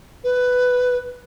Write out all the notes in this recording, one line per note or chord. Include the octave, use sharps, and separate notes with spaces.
B4